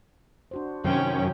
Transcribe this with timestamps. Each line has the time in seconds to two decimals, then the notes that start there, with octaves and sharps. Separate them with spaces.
0.51 D4 F#4 C5
0.84 F#2 C3 D#3 C#4 C5 G5